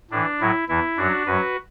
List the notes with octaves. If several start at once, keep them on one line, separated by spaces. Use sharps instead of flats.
A2 E3 D4
A2 F#3 E4
E2 E3 E4
F#2 F#3 D4 F#4
F#2 F#3 F#4 B4